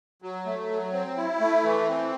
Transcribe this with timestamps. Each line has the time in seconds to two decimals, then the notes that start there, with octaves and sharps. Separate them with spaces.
0.22 F#3
0.46 A3
0.71 F#3
0.93 C4
1.16 E4
1.40 A3
1.64 E3
1.88 C4